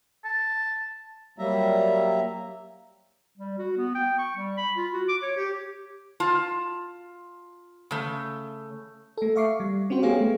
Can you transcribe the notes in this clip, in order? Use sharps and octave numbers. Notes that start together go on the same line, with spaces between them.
A5
F#3 G3 A#3 E5 A#5
G3
F#4
B3
G5
C#6
G3
B5
F4
F#4
D6
C#5
G4
F4 A5
C#3 A3
A3 A4
E5 F5 C#6 D6 C7
G3
C4 C#4 F#4 C5
A3 B3 G4 G#4 C#5 F5
A3